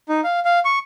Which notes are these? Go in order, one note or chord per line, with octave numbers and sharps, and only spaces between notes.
D#4
F5
F5
C#6